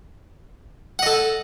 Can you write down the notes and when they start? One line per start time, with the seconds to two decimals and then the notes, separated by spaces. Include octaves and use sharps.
0.99 F#5
1.03 D#5
1.06 A4